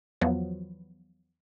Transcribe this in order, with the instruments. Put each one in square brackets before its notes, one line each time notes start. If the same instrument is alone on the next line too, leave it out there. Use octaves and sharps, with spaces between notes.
[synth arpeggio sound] E2 F3 F#3 B3